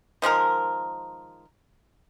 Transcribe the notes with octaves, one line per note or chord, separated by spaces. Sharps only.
D#3 F3 G#3 A#4